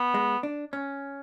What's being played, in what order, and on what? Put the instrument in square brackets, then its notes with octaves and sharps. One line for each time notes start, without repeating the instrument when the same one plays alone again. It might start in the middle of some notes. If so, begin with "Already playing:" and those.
Already playing: [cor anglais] B3
[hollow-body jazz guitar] G#3
D4
C#4